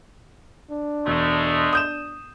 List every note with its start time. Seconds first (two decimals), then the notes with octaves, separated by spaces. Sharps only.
0.70 D4
1.07 E1 G#3 A3
1.73 D#6 G6 E7